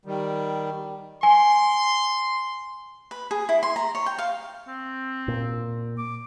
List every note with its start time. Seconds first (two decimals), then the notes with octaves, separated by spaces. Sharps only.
0.06 D#3 G3
1.23 G#5 C6
3.11 B4
3.31 G#4
3.49 E4
3.63 C6
3.76 A#5
3.95 C#5
4.06 G5
4.19 F5
4.67 C4
5.28 A#2
5.98 D6